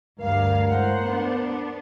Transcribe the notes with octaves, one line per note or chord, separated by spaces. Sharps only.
D2 G2 A#4 F5
A2 G#3 C5 F#5
B3 D4